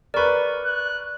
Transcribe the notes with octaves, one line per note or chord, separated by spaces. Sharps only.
A#4 B4 D5 C#6
F#6